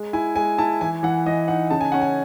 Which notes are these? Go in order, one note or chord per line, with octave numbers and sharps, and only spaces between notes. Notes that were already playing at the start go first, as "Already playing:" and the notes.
Already playing: G#3
E4 G#5
G#3 G#5
E4 A5
E3 G#5
E3 F#5
E3 D#5
D#4 F#5
C#3 A5
G#5
C#4 F#5
G#5